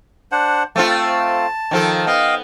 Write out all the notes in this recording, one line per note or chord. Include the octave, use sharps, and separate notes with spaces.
D4 C5 F#5
A3 C4 F4 A5
D#3 F3 A4
B3 D#5 F5 G5